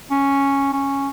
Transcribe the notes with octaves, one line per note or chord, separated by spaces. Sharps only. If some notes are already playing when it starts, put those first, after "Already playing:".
C#4
C#4